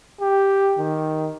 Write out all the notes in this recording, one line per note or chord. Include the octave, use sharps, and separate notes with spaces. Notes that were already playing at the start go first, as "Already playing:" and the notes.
G4
D#3